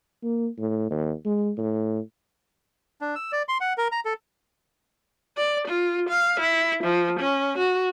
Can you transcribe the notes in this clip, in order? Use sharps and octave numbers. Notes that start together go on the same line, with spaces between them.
A#3
A2
D#2
G#3
A2
D4
E6
D5
C6
F#5
A#4
A#5
A4
D5
F4
F5
E4
F3
C#4
F#4